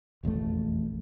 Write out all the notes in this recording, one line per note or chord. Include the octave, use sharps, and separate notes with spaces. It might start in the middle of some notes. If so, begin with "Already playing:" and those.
E1 A1 F2 A3